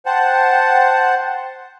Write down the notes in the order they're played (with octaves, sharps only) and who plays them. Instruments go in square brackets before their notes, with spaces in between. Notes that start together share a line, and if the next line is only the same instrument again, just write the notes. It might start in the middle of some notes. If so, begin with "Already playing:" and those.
[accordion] C5 F#5 A5 [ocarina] G5